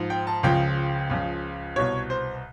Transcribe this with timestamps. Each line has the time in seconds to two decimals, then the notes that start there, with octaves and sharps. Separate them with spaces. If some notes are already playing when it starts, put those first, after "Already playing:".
Already playing: G#2 F3
0.10 G5
0.27 A5
0.43 C#2 C#3 F3 G5
1.10 C#2 C#3 F3
1.76 C2 B2 C#5
2.10 C5